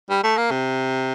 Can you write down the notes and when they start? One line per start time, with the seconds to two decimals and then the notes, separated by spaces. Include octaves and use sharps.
0.10 G3
0.23 A3
0.37 A#3
0.51 C3